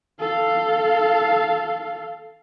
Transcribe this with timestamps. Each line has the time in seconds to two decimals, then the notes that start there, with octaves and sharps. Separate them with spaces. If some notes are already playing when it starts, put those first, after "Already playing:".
0.19 A4 F5